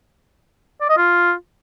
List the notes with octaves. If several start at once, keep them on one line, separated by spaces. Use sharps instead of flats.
D5
D#5
F4